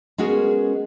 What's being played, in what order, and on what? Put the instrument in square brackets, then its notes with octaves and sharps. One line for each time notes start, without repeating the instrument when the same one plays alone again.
[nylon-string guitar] G#3 B3 C#4 F#4 G#4 A#4